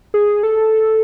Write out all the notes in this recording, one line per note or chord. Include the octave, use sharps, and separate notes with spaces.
G#4
A4